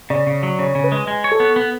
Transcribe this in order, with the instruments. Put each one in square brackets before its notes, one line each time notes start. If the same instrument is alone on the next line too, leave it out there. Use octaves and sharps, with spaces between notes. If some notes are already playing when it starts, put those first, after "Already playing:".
[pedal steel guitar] C#3 [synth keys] D5
[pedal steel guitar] C#3
F#3
[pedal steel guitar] C#3 [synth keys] C#5
[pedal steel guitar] C#3
[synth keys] B4
[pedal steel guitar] G#3
G#3
C#5
[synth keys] A4
[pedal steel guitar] B3
B3